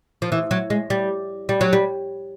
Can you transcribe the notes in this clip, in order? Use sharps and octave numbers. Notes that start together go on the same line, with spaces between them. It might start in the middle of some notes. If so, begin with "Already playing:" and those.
F3
E3
F#3
G#3
G3
G3
F#3
G3